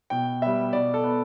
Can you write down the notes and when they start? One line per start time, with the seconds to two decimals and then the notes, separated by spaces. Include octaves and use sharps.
0.10 B2 G5
0.42 G3 B3 E5
0.73 B2 D5
0.94 A4
1.04 B3